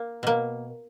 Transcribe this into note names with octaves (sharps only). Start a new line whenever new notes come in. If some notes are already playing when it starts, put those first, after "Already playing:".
Already playing: A#3
B2 A#3